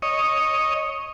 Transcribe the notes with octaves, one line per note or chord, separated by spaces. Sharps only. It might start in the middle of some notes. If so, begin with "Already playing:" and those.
C#5 D#5